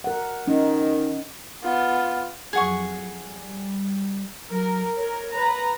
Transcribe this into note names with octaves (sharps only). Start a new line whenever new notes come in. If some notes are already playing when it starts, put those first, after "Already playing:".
A#4 F#5
D#3 C#4 D#4
B3 F4
F2 F#3 G#4 F#5 C#6
G3
F#3 A#4
A#4 C#5
B4 A#5